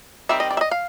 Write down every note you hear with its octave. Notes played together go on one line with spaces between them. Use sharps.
D#3 G3 C4 E5
D#5
D5
E5
D#5
F5